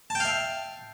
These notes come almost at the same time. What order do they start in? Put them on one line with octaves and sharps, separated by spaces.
A5 G5 F5 E5